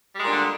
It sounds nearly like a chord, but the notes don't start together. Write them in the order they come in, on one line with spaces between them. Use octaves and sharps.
G3 G#3 A#2 D4 D3